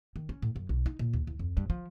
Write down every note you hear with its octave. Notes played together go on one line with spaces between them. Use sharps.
D#3
C#4
A2
F#2
B1
D#4
A#2
D#2
E2
F2
G2
F3